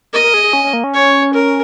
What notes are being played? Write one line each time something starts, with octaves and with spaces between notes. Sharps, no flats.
A#4 D#5
A#4
G#4
G#4
C#4
C#4
A#3
C#4
C#5
A#4